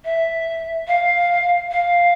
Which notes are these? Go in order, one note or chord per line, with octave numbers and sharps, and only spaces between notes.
E5
F5
F5